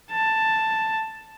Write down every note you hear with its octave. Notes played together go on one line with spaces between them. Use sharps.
A5